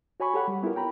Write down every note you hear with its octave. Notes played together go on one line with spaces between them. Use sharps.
F#4 C#5 G#5 B5 C#6
G4 A4 C#5 F#5 B5
G3
B3 E4 F4 G4 A#4
G5 A#5 B5